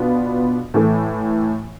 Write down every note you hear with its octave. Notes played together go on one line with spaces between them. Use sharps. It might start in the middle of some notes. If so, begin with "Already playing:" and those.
Already playing: B2 B3 D4 F4
A2 E3 A3